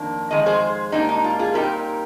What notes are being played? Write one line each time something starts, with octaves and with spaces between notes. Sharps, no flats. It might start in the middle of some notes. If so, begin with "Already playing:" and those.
Already playing: F2 D#3 A#3 D4
F2 D#3 G#3 D#5
G#4 C5
G#2 G3 A#3 D4 D#4
D#4
F4
F4 G#4
A#2 G3 C4 D#4 G4 A#4